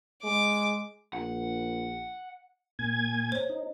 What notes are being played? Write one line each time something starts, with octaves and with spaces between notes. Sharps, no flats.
G#3 D6
A#1 F#5
A#2 G#5 G#6
C5 C#5
D#4